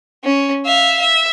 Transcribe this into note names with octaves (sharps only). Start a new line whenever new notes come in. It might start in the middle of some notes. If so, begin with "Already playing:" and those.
C#4
E5 F5
E5